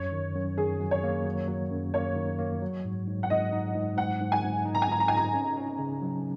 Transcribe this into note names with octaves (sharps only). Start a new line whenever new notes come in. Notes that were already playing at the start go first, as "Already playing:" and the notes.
Already playing: F#2 C#5
D#3
F#2
D#3 G#4
F#3
C#5
A#3
F#3
F#3
F#2
A#3 C#5
D#3
A#3
F#3
G#2
G#2
F#5
G#2 D#5
D#4
G#2
G#2 F#5
G#2
G#5
G#2
D#4
A#5
G#5
G#2 A#5
A#5
D#4 G#5
A#5
C#4
C#4
C#3
F#3